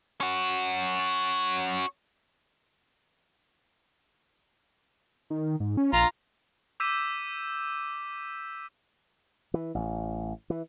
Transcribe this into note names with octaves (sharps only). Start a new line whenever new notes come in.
C#4 F#4
D#3
G#2
C#4
A#1 F4 A#5
D6 E6 G6 B6 D#7 E7
E3
A1
E3